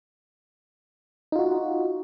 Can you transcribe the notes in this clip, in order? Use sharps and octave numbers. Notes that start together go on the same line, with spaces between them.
D#4 F4 F#4